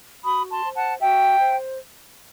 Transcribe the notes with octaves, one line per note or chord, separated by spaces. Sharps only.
F#4 B5 D#6
A5 C6
C5
F#5 A5
F#4 E5 G5
C5